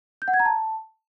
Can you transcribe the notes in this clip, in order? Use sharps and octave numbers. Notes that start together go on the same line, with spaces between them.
G6
F#5
G#6
A#5
A5